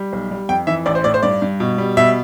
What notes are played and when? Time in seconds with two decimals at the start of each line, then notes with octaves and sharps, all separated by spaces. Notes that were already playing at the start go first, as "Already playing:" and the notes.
Already playing: G3
0.13 B1
0.31 G3
0.49 F2 G5
0.67 E3 E5
0.86 A1 D5
0.95 C5
1.04 A2 D5
1.14 C5
1.23 G2 D5
1.42 G2
1.60 B2
1.78 G3
1.97 B2 E5